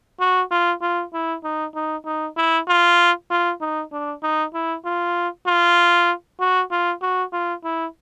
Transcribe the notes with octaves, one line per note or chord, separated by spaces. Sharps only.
F#4
F4
F4
E4
D#4
D#4
D#4
E4
F4
F4
D#4
D4
D#4
E4
F4
F4
F#4
F4
F#4
F4
E4